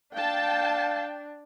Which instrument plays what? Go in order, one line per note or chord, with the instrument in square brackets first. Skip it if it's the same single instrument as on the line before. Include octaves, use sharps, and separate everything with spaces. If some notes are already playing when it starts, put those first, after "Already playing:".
[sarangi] D4 [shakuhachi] F5 [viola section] G5 A5